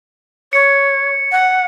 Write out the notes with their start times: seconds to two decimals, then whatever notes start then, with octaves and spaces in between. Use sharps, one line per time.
0.53 C#5 C#7
1.32 F#5